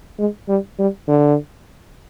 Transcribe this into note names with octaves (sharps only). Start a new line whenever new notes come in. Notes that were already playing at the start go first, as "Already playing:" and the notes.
G#3
G3
G3
D3